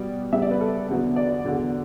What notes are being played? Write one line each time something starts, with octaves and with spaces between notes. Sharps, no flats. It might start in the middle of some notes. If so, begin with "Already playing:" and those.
Already playing: B2 G3 B3 D5
C#3 G3 B3 E5
D5
B4
A4
E2 D3 F#3 B3
D5
E2 D3 F#3